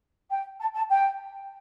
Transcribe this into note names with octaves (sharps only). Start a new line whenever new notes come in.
G5
A5
A5
G5